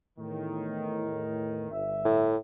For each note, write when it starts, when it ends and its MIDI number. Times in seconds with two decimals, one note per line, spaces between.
0.18 1.68 40
0.18 1.68 45
0.18 1.68 51
1.71 2.32 31
1.71 2.32 76
2.05 2.37 45